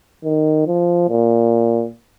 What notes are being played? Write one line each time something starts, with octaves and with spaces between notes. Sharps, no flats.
D#3
F3
A#2